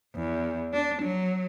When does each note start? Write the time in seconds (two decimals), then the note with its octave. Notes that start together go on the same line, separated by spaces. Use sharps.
0.15 E2
0.73 D4
1.02 F#3